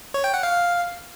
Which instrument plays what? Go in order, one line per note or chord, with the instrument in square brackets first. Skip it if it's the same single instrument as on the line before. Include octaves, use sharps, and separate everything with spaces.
[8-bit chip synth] C#5
G5
F#5
F5